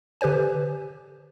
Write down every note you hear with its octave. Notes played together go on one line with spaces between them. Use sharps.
D3 G4 B4 C5 G#5